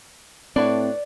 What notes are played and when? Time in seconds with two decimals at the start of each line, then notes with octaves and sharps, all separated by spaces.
0.56 A2 C4 D4 B4 C#5 D5